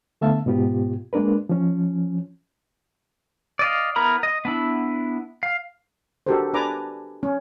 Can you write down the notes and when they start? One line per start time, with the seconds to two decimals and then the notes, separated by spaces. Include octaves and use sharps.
0.21 D3 A3 B3 E5 F5 A5
0.46 G#2 B2 B3 F4 G4
1.13 G#3 A#3 D4 A#4 B4
1.49 F3 C#4
3.59 D5 D#5 F5
3.96 B3 E4 A#4 A#5 B5
4.23 D#5
4.45 B3 D4 E4
5.43 F5
6.27 D4 F#4 G4 A4 A#4 C5
6.54 D4 B4 D5 G#5 A#5 D6
7.23 C#4